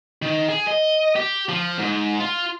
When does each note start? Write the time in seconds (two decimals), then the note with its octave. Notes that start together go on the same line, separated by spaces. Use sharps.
0.22 D#3
0.48 G#4
0.67 D#5
1.16 G4
1.49 F3
1.78 G#2
2.20 F4